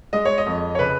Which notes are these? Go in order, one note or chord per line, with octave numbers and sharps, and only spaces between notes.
G#3 D#5
C#5
D#5
F2
C#5
C#3 B4